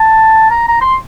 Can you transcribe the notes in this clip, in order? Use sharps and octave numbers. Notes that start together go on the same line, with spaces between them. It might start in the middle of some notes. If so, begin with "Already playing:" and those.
Already playing: A5
A#5
A#5
C6